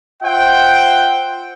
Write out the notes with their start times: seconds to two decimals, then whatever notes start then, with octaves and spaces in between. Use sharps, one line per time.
0.23 F4 C5 E5 F#5 G5